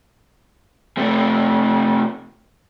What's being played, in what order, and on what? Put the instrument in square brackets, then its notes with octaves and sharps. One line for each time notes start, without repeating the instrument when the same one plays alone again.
[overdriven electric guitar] C3 A3